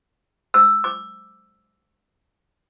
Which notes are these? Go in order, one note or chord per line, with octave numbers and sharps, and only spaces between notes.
E6
D6